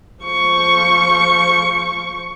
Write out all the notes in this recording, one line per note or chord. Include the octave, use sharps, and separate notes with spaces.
F3 C#6